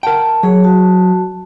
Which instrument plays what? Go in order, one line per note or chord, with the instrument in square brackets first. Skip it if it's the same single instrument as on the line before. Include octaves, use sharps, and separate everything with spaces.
[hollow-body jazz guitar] A#4 F#5 G5 [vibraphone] A5
[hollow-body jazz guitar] F#3 [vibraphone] G#4 C#5
[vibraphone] F#4 A5